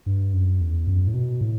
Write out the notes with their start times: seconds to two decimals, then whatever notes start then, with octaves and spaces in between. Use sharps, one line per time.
0.06 G2
0.33 F#2
0.61 E2
0.87 F#2
1.07 A2
1.14 B2
1.41 A2